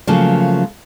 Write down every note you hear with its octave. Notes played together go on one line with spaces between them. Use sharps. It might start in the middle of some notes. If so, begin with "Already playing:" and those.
C#3 F3 F#3 A3 A#3